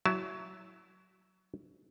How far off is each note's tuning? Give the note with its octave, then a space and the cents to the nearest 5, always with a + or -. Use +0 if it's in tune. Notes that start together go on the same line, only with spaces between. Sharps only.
F#3 +15 E4 +0 A5 -10